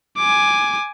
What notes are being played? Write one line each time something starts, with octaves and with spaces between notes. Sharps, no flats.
G#5 D6